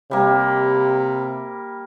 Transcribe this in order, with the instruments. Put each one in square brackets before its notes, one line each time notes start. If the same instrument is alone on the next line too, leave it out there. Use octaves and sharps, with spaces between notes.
[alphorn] C3 [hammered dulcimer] G3 A#3